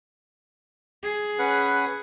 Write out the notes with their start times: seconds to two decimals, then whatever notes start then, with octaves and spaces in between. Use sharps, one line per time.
1.03 G#4
1.39 C#4 B4 F#5